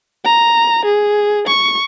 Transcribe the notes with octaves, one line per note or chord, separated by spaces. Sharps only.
A#5
G#4
C#6